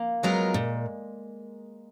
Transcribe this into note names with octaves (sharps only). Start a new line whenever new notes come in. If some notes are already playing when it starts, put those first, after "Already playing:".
Already playing: A#3
F#3 G#3 B3 F4 A#4
A#2